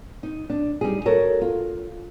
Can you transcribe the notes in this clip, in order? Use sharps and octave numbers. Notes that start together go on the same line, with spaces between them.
D#4
D4
G3 D#4 G#4
F#4 A4 A#4 C#5
F4